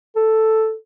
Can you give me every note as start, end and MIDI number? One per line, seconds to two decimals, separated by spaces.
0.16 0.74 69